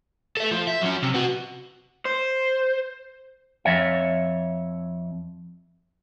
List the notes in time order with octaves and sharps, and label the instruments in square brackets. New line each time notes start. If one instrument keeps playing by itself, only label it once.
[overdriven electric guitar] A4 E5
F3
E5
F#3 C#4
C3
B3 F#4
[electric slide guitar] C5
[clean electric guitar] F2 C#5 E5